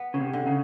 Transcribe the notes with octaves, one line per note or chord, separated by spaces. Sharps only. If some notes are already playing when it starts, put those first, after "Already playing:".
Already playing: B3
C#3
C3
D3
C#3